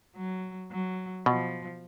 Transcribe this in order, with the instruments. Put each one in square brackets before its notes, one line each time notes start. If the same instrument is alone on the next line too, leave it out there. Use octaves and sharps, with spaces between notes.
[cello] F#3
F#3
[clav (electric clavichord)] B2 [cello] F3